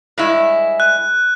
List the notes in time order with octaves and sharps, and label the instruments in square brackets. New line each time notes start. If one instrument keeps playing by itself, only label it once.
[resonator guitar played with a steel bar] G2 G#3 E4
[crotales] F#6